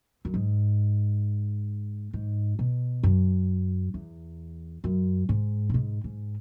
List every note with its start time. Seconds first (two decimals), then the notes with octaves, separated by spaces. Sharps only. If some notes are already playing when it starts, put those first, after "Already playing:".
0.25 F#2
0.34 G#2
2.13 G#2
2.59 B2
3.03 F#2
3.94 E2
4.84 F#2
5.29 G#2
5.69 B2
5.74 G#2
6.04 G#2